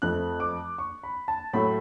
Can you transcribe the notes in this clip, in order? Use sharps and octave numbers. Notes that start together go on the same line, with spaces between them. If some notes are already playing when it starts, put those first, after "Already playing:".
F2 F3 A3 F#6
D6
C#6
B5
A5
A2 F#3 A3 B5